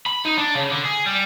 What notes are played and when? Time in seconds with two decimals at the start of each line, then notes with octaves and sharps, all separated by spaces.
0.06 B5
0.25 D#4
0.38 D4
0.55 C#3
0.70 D3
0.85 G#4
1.06 G3